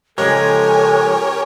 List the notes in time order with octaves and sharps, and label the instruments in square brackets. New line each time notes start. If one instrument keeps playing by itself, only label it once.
[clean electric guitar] C#3 F3 G#3 [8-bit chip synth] G4 A#4 C#5 [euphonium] A4 [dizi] G#5